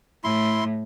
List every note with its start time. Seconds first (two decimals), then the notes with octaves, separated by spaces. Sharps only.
0.24 A2 E4 C6